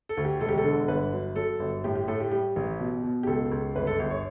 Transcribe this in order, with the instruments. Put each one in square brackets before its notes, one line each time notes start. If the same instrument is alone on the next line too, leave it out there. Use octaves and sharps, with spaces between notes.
[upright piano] A4
D2
G4
E1 A4
G4
A4
D3
G1 B4
F#3
F#3 A4
G1
A2 G4
G4
A2 A4
G4
G3 G4
A1
B2
B2
G4
C#2 A4
C#2
G1 B4
A4
G1
C#5